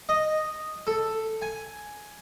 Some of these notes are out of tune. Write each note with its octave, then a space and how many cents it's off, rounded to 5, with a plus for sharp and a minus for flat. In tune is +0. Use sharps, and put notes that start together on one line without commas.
D#5 -5
A4 +5
G#5 +5